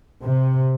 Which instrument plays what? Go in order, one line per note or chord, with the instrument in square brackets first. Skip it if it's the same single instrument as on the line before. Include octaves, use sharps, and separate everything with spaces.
[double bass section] C3